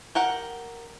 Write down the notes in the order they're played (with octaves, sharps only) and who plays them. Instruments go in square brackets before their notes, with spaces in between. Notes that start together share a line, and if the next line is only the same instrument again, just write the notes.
[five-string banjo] G4 A#4 F#5